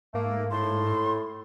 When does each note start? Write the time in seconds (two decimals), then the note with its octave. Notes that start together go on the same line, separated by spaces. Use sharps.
0.14 G#2 A3 A#3
0.51 A2 C6